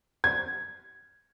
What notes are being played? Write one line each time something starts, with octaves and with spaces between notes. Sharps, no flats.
G#6